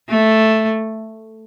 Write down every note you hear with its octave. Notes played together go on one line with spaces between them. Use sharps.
A3